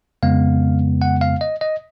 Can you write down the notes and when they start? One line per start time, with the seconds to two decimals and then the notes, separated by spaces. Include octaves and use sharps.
0.23 F2 C#3 G#3 B3 F5
1.02 F#5
1.21 F5
1.41 D#5
1.61 D#5